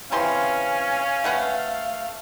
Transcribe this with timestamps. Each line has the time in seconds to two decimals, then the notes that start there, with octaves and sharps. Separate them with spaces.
0.12 C3 E3 C#4 F5 C6
1.24 A3 B4 F#5